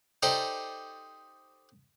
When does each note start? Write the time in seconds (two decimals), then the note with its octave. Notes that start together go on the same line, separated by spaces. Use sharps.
0.23 D#4 G4 A4 C5 D5 D#5